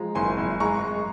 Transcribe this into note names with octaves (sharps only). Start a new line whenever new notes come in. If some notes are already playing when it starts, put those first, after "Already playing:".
Already playing: F3 G#3 A#5
F#1 G#5 C6
F#1
G#3 A#5 C#6
G#3